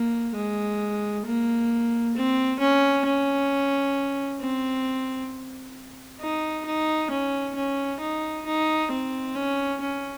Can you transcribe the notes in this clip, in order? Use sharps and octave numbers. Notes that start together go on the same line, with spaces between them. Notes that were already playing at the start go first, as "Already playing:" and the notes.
Already playing: A#3
G#3
A#3
C4
C#4
C#4
C4
D#4
D#4
C#4
C#4
D#4
D#4
C4
C#4
C#4